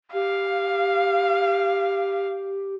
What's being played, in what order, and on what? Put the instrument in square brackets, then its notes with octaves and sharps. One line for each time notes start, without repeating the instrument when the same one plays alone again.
[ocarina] G4 [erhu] F5